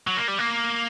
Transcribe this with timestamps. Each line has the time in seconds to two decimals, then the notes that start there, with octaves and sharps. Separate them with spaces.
0.07 F#3
0.17 A#3
0.28 G3
0.39 A#3